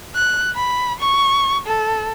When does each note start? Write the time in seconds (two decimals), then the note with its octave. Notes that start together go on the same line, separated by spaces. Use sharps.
0.15 F#6
0.55 B5
1.00 C#6
1.67 A4